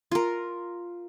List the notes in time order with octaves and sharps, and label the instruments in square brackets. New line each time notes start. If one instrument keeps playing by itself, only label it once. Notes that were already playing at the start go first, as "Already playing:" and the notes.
[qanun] F4 A#4